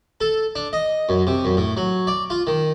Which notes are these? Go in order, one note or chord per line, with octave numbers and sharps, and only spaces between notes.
A4
D4
D#5
F#2
C3
F#2
A2
F#3
D5
F4
D#3